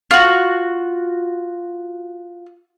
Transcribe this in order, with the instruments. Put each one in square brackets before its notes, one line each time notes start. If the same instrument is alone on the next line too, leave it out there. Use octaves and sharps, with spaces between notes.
[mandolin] F4 F#4